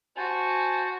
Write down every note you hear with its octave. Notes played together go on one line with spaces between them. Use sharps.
F#4 C5 G#5 A5